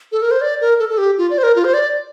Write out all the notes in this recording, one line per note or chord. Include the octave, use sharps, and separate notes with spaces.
A4
A#4
C5
D5
A#4
A4
A4
G4
F4
D5
C5
A#4
F4
C5
D5